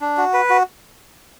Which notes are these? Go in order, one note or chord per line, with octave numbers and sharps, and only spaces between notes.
D4
F#4
B4
F#4